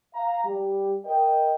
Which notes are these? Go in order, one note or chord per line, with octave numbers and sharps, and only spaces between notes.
F5 A#5
G3 G4
A#4 D#5 G5